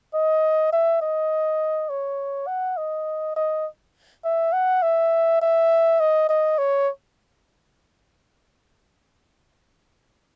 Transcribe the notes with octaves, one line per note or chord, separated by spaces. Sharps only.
D#5
E5
D#5
C#5
F#5
D#5
D#5
E5
F#5
E5
E5
D#5
D#5
C#5